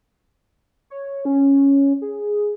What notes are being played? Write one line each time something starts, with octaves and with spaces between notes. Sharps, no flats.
C#5
C#4
G#4